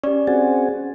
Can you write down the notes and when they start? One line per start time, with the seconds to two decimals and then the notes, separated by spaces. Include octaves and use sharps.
0.04 C#4 G4 D5
0.27 C4 F#4 G#4 A6